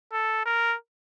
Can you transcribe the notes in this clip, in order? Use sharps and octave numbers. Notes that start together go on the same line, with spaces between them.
A4
A#4